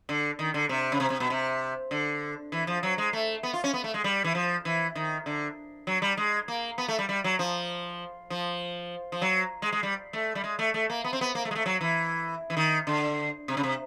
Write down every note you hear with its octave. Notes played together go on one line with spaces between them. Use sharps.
D3
D#3
D3
C3
C#3
C3
C3
B2
C3
D3
E3
F3
F#3
G#3
A3
B3
F4
C#4
B3
A3
G#3
G3
E3
F3
E3
D#3
D3
F#3
G3
G#3
A#3
B3
A3
G3
G3
F#3
F3
F3
F3
F#3
G#3
G#3
G3
A3
G3
G#3
A3
A3
A#3
B3
C4
B3
A#3
A3
G#3
A3
F#3
E3
E3
D#3
D3
C3
C#3
C3